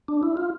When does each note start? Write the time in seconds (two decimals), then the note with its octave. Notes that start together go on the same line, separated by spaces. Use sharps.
0.08 D4
0.23 E4
0.37 F4